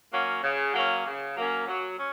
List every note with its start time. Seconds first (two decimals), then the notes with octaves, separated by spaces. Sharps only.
0.12 F#3 A#3 C#4
0.43 C#3
0.74 F#3 A#3 C#4
1.05 C#3
1.36 F#3 A#3 C#4
1.66 F#3
1.97 C#4